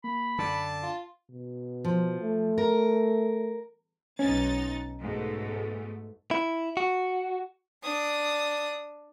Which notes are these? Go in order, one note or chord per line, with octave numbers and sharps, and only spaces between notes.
A#3 B5
F#2 D3 A5
F4
B2
F3
A3
A#4
B1 C#4 D#4 A6
G#2 B2 A3
E4
F#4
D4 D#6